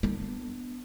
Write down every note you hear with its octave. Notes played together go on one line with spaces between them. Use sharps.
B3 D4